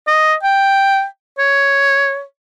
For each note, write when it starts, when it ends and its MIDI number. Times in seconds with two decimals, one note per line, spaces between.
0.07 0.34 75
0.43 1.05 79
1.39 2.23 73